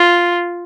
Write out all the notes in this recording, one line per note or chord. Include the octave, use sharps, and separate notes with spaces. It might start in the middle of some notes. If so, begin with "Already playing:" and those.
Already playing: F4